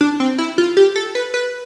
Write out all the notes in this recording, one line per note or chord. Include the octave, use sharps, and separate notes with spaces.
D4
C4
E4
F4
G4
A4
B4
B4